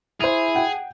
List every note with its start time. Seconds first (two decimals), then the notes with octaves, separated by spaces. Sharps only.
0.21 E4 G#4 C5 F7
0.55 F#5 G5